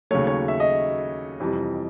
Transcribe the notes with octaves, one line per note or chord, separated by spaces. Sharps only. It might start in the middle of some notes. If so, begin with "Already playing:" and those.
D#2 C#3 F#3 A3 C#5
C#5
E5
D#5
F2 C3 E3 G3